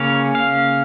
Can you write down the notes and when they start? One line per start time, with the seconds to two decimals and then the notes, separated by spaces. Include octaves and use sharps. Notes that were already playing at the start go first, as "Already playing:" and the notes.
Already playing: C#3 A#3 C#4 F5
0.35 F5